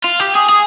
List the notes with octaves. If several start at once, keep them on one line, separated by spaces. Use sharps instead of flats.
F4
G4
G#4
G#4